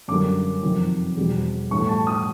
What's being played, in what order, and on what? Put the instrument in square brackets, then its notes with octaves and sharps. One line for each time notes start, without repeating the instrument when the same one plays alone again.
[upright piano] F#2 D3 G3 A#3 D6
F2 C3 D#3 F#3
E2 B2 G3 C4
A2 E3 G3 C#6
A5
D#6